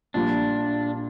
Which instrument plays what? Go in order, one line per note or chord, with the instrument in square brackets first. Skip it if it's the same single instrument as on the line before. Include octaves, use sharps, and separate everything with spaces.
[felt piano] A#1 A#2 G3 [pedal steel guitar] D4